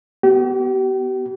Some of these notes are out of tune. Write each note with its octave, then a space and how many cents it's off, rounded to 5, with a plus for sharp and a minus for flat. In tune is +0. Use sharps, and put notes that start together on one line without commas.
B3 +10 G4 -40